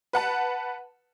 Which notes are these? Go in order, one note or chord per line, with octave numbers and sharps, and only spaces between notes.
B4 F#5 A5